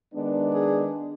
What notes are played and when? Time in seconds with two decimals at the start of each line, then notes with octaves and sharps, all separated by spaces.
0.14 D#3 G#3 B3 D4
0.52 G#4